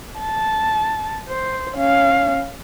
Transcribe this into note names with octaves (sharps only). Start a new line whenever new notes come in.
A5
C5
C#4 F5